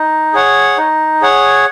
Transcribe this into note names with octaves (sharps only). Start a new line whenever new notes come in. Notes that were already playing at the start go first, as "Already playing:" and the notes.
Already playing: D#4
G#4 C#5 F#5
D#4
G#4 C#5 F#5